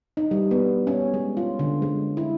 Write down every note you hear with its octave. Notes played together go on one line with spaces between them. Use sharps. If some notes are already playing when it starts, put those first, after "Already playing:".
D#4
G3
B3
C#4
G#3
F4
D3
G#3
E4